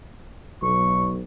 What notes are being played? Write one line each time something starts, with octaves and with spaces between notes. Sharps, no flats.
B1 C#6